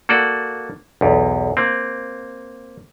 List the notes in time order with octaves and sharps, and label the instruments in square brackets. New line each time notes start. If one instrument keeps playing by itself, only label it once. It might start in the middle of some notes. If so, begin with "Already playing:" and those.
[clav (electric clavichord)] A#3 F#4 A4 D5
B1 E2
A#3 C4